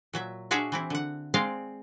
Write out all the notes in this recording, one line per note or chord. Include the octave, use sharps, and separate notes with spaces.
A#2 F#3 E5
D4 F#4 G#4 C#5 E5 F5
E3 C4 E4
D3 F#5
G#3 C4 D5 D#5 F5